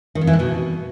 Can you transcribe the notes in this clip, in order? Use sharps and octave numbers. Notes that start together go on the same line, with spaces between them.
D#3
F2
E3
A2
B2